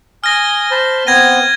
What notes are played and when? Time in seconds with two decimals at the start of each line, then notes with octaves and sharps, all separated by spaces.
0.24 G#5 D#6 F6 A#6
0.71 C5 A5 B5
1.07 B3 C4 G#6 A#6 D#7